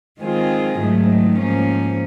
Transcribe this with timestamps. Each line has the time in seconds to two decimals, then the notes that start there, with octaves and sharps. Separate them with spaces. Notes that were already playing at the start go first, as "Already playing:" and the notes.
0.22 D#3 G#3 C4 F4 G#4
0.79 G#2 D#3 F#3 A3
1.38 G#2 F3 A#3 C#4